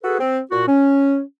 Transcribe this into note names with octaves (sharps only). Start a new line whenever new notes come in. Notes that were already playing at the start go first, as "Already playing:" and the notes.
F#4 G#4 A4 B4
C4
A#2 F#4
C#4